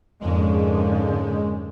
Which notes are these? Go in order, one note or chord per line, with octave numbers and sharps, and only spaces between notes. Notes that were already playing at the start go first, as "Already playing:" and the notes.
F2 G#2 D3 G#3 A#3 C#4